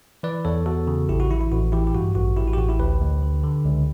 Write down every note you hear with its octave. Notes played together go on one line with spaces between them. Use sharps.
E3 B4 D5
E2 A4 C#5
E2 F#4 A4
C#3
A1 E4 G4
F#4
E3 E4
E4
A1 F#4
E3 E4 G4
G4
G2 F#4
A1 F#4
A1 E4 G4
F#4
G4
A1 F#4
E4 G4
D2 G4 B4
D2
D3
D3
C#2